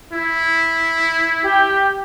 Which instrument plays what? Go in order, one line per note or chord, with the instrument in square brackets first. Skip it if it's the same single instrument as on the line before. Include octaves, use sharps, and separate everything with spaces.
[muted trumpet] E4
[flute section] G4